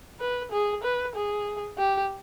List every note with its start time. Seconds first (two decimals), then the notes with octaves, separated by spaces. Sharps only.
0.20 B4
0.51 G#4
0.83 B4
1.15 G#4
1.78 G4